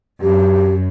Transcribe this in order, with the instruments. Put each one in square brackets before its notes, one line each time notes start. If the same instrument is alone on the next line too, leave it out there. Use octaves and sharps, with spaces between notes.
[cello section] F#2 [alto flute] G4